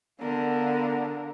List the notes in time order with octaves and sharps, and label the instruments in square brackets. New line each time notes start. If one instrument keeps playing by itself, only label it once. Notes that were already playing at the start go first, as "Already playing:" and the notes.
[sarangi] D3 [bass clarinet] B3 [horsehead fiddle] A#4 F5